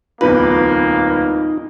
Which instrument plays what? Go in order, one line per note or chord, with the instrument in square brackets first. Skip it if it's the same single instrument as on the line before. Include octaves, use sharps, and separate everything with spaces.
[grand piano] D1 E2 B4 [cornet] A#3 [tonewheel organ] D#4 [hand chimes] F4